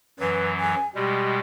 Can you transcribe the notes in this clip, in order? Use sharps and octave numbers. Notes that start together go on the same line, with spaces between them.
F#2 E3 F#3 B4
G#5
B2 G3 G#3 G4